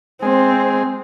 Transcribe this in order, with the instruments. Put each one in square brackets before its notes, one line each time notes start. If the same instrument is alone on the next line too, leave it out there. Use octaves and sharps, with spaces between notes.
[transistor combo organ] G#3 [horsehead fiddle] C4